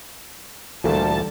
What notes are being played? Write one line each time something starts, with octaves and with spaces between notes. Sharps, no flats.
D2 A#2 E3 G3 A4 A5